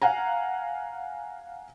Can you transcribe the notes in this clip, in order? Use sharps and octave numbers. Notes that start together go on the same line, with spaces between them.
F5 F#5 G#5 A#5